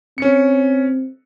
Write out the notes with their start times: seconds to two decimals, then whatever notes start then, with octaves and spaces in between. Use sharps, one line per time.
0.18 C4 C#4 C#7